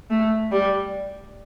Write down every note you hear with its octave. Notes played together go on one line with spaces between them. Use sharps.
A3
G3